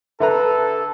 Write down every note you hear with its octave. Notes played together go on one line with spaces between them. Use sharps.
D3 A4 B4 E5 A#5